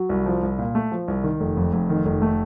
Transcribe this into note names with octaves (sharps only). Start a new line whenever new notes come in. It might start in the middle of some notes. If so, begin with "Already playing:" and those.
Already playing: F#3
C2
F3
C2
A#2
A3
F3
C2
D#3
F1
F2
F1
D#3
F1
A3